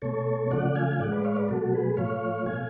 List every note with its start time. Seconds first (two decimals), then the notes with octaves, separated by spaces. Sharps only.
0.02 B2 A3 A4 C#5
0.51 C#3 F3 A3 D5 F#5
0.75 F5 G#5
0.99 A2 G#3 D5 F#5
1.12 B4 D5
1.24 C#5 F5
1.36 B4 D5
1.48 B2 F#3 A3 F#4 A4
1.73 G#4 B4
1.97 A2 F3 A3 C#5 F5
2.46 B2 A3 F5 G#5